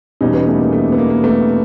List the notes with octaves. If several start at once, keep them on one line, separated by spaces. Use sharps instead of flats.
E2 B2 G3 C#4 D#4
B3 C#4
A3 B3
A#3
A3
A#3
B3
A#3
A#3
A3 B3